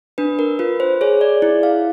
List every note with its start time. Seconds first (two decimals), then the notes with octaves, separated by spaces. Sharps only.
0.18 D4 B4
0.39 A#4
0.59 F4 B4
0.80 C5
1.01 G#4 C#5
1.21 D5
1.42 E4
1.63 F5